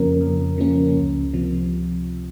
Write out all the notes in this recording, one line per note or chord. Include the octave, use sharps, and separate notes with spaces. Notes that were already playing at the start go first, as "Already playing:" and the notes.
Already playing: F2 C#3 F3 A#3 C#4 A#4
F2
C#3 F3 A#3 C#4
C#2
C3 F3